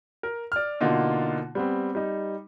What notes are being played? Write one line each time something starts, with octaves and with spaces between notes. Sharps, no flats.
A#4
D5 F6
B2 D3 A#3 D#4 F4
G3 B3 C4
G3 D#4